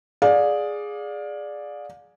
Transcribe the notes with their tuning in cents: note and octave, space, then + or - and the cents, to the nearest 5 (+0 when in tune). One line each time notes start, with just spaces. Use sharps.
G#4 +0 D5 +0 F5 +30